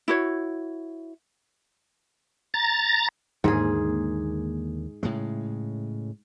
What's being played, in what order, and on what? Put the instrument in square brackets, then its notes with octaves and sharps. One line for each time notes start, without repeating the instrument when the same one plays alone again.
[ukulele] E4 F#4 C#5
[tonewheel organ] A#5 A6
[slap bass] D#2 D3 A#3 [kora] G#2 G#4
[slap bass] A2 C#3 G#3